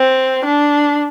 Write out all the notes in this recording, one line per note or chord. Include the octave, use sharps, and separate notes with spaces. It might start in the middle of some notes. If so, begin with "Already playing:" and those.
Already playing: C4
D4